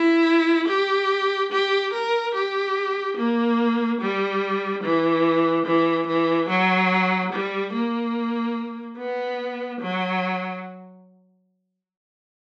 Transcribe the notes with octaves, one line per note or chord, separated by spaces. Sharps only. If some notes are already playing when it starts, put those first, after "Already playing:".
Already playing: E4
G4
G4
A#4
G4
A#3
G3
E3
E3
E3
F#3
G3
A#3
B3
F#3